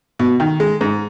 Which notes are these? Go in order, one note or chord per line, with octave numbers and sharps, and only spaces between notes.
B2
D#3
G#3
G#2